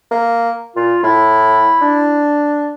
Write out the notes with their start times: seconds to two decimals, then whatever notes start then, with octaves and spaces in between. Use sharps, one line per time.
0.11 A#3
0.76 A#2 F4
1.03 A2 E4
1.82 D4